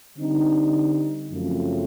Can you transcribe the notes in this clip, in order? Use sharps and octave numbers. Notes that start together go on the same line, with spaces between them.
D3 G3 C4 D#4
F#2 C#3 F3 A3 C4